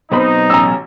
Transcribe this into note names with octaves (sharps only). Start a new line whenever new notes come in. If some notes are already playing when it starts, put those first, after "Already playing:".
B1 B2 C4 D#4 C5 B5
A1 C#4 A#5 E6